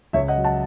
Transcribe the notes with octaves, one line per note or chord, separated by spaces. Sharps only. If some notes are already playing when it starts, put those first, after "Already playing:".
C#2 C#5 E5
D#5 F#5
F#3
F#5 A5